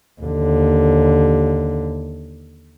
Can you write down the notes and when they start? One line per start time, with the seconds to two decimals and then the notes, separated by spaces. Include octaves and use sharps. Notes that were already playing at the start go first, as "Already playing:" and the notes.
0.22 D#2 D3